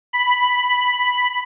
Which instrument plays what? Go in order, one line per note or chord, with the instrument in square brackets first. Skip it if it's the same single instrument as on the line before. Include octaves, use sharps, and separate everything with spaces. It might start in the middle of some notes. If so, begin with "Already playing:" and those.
[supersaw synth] B5